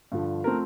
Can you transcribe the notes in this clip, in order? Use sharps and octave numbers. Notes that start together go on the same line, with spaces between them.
G2 D3 F3
F3 A3 C4 A#4